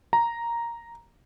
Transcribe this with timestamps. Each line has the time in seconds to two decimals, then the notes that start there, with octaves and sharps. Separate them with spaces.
0.13 A#5